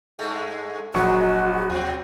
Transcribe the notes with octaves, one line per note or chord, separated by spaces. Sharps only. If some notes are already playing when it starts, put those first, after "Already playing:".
G2 G#3 A3
F1 A#1 F#3 G#3 F#4 C#6
D#2 B2 F#3 C4